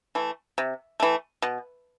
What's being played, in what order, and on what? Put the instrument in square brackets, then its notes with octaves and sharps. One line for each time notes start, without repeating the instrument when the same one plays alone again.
[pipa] E3 A3
C3
E3 A3
B2